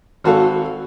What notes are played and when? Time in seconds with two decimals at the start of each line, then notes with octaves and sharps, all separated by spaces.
0.24 G#1 F#4 A4 F5